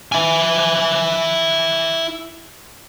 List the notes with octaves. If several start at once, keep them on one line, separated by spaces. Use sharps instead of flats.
E4 G#5